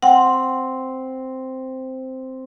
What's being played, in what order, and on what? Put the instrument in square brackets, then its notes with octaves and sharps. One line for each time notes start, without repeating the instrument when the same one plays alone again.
[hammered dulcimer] C4 [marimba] F#5 G5